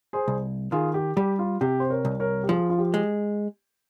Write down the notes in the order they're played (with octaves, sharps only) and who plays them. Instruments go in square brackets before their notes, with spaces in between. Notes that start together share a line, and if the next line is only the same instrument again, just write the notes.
[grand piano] G#4 C5
[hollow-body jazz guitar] C2
[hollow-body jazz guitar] D#3 [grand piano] F4 G#4
[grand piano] G4
[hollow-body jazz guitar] G3 [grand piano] G4
[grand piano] F4
[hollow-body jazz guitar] C3 [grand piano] G4
[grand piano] C5
A#4 C#5
[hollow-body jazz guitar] C2
[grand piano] A#4 C#5
G4
[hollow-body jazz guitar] F3 [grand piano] F4 G#4
[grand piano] F4
G4
[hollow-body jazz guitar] G#3